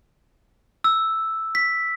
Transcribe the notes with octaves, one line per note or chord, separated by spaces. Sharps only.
E6
B6